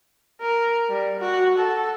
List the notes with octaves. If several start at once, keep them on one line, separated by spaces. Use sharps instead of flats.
A#4
G3
F#4
A4